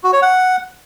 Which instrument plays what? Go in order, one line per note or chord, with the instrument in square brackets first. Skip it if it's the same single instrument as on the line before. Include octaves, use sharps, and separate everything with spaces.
[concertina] F#4
C#5
F#5